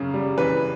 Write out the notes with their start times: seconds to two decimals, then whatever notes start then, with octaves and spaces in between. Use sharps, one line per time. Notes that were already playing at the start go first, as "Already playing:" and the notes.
Already playing: F#2 C#3
0.14 G3
0.38 E3 B4